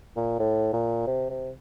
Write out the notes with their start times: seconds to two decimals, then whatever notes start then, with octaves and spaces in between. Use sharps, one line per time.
0.16 A#2
0.39 A2
0.73 A#2
1.07 C3
1.30 C3